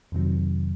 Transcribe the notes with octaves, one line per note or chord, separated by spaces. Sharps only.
F2 C3 D#3 F#3